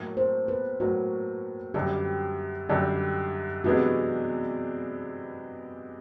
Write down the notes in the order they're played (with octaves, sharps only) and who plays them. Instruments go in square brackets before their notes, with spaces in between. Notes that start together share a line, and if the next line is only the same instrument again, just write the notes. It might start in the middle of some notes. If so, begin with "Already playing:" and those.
Already playing: [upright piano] A2 F#3 A#3
[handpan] C5
B4
[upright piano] A2 F#3 A#3 [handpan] F#4
[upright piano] F#2 D3 G3 [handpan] G4
[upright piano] F#2 D3 G3 [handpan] G4
[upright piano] C3 E3 G#3 B3 D4 [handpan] F#4